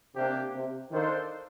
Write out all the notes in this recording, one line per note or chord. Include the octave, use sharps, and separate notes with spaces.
C3 A#3 D4 G4
C3
D#3 D4 A4 C5 F5